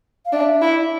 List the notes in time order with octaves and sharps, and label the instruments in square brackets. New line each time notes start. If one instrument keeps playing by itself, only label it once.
[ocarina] F5
[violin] D4 [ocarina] E5
[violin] E4